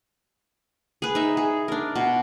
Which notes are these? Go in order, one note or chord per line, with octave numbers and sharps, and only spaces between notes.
G#4 B4
D#4 E5
G#4
D4 A#4
B2